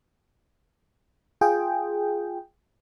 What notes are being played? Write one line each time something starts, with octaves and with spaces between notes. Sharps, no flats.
F4 G#4 G5